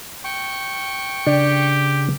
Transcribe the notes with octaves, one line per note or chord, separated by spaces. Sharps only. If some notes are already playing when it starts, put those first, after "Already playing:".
G5 C#6
C#3 D4 G4